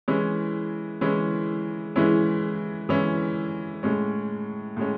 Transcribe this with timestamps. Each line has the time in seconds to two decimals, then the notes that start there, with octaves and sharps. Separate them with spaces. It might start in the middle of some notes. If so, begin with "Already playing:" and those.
0.08 E3 G#3 C#4 E4
1.01 E3 G#3 C#4 E4
1.96 E3 G#3 C#4 E4
2.89 E3 G#3 C#4 E4
3.83 A2 G#3 C#4
4.77 A2 G#3 C#4